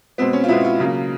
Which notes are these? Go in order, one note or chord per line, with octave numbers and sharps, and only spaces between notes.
B2 G#3 B3 C4
C#4
F4
B2 G#3 B3 E4
F4
C#3 F#3 A#3